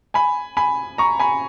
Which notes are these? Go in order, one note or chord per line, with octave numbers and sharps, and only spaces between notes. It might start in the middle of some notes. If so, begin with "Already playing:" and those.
G#5 B5
G#5 B5
A#5 C#6
G#5 B5